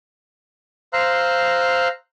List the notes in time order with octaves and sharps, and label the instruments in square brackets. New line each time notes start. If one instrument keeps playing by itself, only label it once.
[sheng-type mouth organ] C5 F5 A#5 C6 E6 F#6